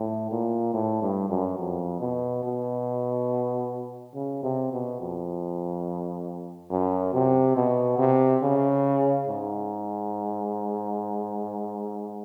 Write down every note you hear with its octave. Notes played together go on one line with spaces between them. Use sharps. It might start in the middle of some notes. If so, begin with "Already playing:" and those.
Already playing: A2
A#2
A2
G2
F#2
F2
B2
B2
C#3
C3
B2
F2
F#2
C3
B2
C3
C#3
G#2